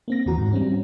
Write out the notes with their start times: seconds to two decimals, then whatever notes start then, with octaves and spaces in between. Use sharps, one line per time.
0.08 A#3 C4 A#6
0.26 D#2 E3 F#4 A#5
0.38 G#2
0.53 G3 C4 C#4